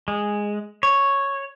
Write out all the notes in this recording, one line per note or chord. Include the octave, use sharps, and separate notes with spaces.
G#3
C#5